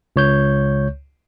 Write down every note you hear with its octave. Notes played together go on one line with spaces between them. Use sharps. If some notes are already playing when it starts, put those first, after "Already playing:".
C#2 C#5 G6